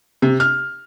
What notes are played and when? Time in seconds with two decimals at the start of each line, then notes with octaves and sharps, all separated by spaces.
0.22 C3
0.40 F6